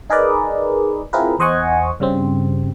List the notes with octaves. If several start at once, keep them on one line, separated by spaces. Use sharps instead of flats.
D#4 G#4 A#4 B4 D5 D#5
C4 E4 F4 G#4 A#4 B4
E2 C5 D#5 F#5 G#5 C#6
G2 C#3 G3 C4